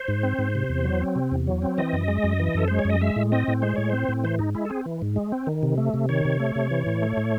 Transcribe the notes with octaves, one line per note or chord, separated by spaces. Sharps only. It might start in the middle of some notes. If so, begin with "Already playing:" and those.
Already playing: C5
G#2
C4
G#2
C3
E2
F#3
C4
C3
E2
F#3
C4
E3 D#5
F#2
G#3
F#2
E3
F#2 A4
G#3 C5
C#5
F#2 D#5
G#3 E5
A2
C4 D#5
A2
G#3 C5
A2 C#5
C4 C5
A2
E3 C5
G#2 D#4
G#3 E4
A4
C4 G#4
E3
G#2
G#3
C4
D#3
C3
A3
C3
D#3 C#5
C3
A3
C3
E3
A2
A3
A2